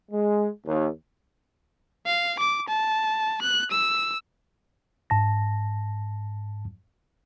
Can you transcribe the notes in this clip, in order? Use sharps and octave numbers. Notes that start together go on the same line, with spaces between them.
G#3
D#2
F5
D6
A5
F#6
E6
G#2 A5 A#6